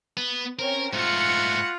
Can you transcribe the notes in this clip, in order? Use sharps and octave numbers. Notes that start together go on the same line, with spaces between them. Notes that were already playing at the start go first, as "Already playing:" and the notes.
B3
C4 C#4 A#4
G#2 G3 A3 F4 F#4 F#5 C#7